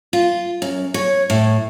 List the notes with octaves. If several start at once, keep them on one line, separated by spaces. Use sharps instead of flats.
F4
F#2
C#5
A2